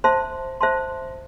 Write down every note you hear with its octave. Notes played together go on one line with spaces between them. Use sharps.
C5 E5 A5 C6
C5 E5 A5 C6